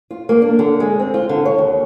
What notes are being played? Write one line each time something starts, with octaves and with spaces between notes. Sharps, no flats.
F4
A#3
D4
D3
G#3
C4
F4
D3
C#5
D#2